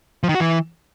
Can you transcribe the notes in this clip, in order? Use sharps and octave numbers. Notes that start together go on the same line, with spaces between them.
F3
D#3
F#4
E3